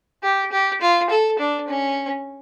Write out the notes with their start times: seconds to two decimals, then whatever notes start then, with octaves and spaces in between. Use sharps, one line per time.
0.23 G4
0.52 G4
0.81 F4
1.10 A4
1.39 D4
1.67 C#4